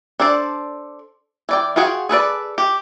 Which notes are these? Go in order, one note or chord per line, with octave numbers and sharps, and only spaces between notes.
D4 A4 C5 D5
E3 D5 G5
F4 F#4 G#4 F#5 G5
G#4 A4 B4 D5
G4